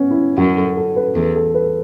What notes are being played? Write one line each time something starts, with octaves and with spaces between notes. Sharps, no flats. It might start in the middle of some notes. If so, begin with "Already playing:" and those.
Already playing: B3 C#4
E4
F#2 F#4
A4
A4
B4
E2 A4
A4
B4